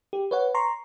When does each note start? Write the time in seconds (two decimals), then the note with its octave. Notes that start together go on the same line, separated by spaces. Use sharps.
0.13 G4
0.31 B4 C#5 F#5
0.55 A#5 C6 C#6